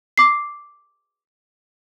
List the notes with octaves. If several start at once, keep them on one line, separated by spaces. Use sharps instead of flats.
D6 C7